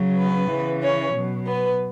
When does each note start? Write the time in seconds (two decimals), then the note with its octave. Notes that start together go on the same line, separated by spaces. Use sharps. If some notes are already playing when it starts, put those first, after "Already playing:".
Already playing: C#3 F#3
0.17 B3 B4
0.50 C#3 E3
0.82 C#4 C#5
1.14 B2 F#3
1.46 B3 B4